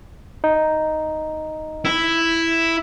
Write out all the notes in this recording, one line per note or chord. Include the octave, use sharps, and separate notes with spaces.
D#4
E4